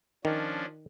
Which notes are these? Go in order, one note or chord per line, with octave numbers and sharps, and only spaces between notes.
D#3 F3 C#4 D4